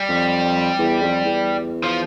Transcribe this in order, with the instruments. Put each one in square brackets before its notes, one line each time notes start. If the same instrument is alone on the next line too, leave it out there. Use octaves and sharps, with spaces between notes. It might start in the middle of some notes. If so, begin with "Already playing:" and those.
Already playing: [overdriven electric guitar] G3
[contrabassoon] F2
E2
F2
E2
[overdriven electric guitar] F3